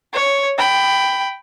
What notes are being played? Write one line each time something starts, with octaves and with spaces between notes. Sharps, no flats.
C#5
G5 B5